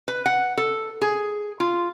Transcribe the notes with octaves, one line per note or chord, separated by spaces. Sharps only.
B4
F#5
A4
G#4
F4